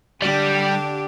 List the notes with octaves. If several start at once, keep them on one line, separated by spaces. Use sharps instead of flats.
D3 G3 D4 G4